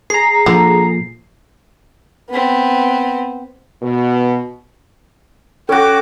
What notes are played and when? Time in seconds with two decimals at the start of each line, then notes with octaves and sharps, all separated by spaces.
0.10 G#4 A#5 C7
0.46 A#2 D3 F3
2.29 B3 C4
3.82 B2
5.69 C#4 F#4 A4 G5 D6